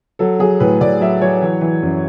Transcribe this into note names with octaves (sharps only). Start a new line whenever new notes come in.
F#3 A4
F#3 G#4
A2 B4
A2 D5
F#3 E5
F#3 C#5
E3
E3
F#2